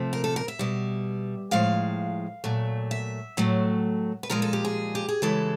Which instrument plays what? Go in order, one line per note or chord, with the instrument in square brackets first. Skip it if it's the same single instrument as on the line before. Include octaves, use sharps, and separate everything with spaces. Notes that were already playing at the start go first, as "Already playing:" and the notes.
Already playing: [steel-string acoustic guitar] C3 F3 A3
A#4
A4
A#4
E5
B2 G3
A2 F3 G#3 F5
A#2 F#3 A3
E5
A2 F#3 A3
B4
A#2 F3 G#3 A#4
A4
G4
G#4
G4
G#4
C#3 E3 G#3 A4